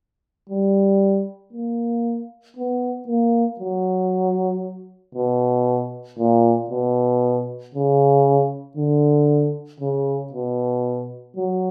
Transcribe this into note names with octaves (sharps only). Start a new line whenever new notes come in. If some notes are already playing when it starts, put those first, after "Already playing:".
G3
A#3
B3
A#3
F#3
B2
A#2
B2
C#3
D3
C#3
B2
F#3